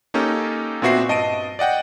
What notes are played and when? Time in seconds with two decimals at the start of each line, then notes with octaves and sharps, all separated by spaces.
0.14 A#3 C#4 D#4 G4 A4
0.82 A#2 B3 C4 F#4 E5 C7
1.09 G2 D#5 A5 D7 D#7
1.59 D5 D#5 F#5 G5